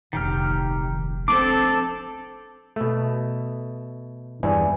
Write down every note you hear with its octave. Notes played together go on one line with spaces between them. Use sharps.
F1 A#1 D#3 G4 F6
F3 C4 D4 A4 D6
B2 A3
E2 G2 B4 D5 G#5